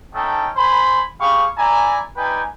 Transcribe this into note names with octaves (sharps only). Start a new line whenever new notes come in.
A3 C#4 D#4 A4 G5
C5 G#5 B5
G4 G#4 F5 B5 C#6
E4 D5 G#5 A#5
G3 D#4 B4 G5 G#5